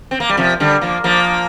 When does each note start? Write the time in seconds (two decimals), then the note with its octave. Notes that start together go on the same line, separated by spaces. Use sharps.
0.11 C4
0.20 A#3
0.29 G3
0.37 C3 F3
0.60 D3 G3
0.82 F3 A#3
1.04 F3 A#3